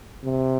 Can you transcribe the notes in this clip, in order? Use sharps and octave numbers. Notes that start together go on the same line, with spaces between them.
C3